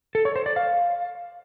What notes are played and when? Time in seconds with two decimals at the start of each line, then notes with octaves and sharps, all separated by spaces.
0.15 A4
0.25 C#5
0.36 C5
0.46 D5
0.56 F5